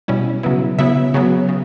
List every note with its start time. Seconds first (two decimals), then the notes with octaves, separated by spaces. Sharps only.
0.08 B2 G3 C#4 E4
0.43 C#3 F#3 B3 E4
0.79 C#3 F#3 B3 E4 E5
1.14 C#3 F#3 B3
1.49 C#3